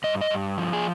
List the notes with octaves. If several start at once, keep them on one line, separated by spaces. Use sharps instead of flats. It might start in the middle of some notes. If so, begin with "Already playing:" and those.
G2 D#5
D#5
G2
F3
G#4